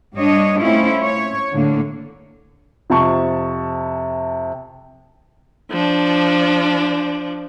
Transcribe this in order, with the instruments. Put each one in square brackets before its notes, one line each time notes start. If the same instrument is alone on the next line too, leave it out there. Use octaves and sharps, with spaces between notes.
[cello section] G2 G3 D4 C#5 D#5
A3 C4 C#4 E4 F4
C#5
A2 D3 A#3
[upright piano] F2 C3 A5 C#6
[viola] F3 D4